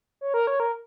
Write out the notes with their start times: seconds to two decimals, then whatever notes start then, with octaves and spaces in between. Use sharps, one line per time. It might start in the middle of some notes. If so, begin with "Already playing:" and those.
0.21 C#5
0.34 A#4
0.47 C#5
0.60 A#4